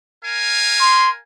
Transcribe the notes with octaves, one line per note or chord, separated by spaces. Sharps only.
A#4 F5 G#5
C6